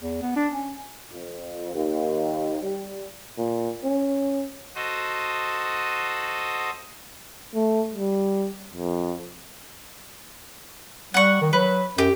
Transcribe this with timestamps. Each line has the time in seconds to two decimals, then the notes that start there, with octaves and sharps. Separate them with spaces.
0.01 E2
0.22 B3
0.36 D4
0.53 C#4
1.12 F2
1.74 D#2
2.63 G3
3.38 A#2
3.84 C#4
4.75 F#4 A4 C5 D#5
7.54 A3
7.94 G3
8.74 F2
11.14 G3 F#5 C#6
11.41 D#3
11.53 F#3 B4
11.98 F#2 G4